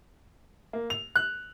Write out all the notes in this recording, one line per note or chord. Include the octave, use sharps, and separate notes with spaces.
A#3
F7
F#6